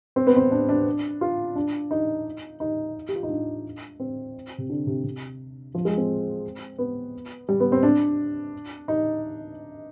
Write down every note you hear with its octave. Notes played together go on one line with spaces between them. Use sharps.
C4
B3
C4
D4
D4
F4
D4
D#4
D#4
G4
F4
D#4
D4
C4
C3
D3
C3
C3
F3
G#3
C4
B3
G3
B3
C4
D4
D#4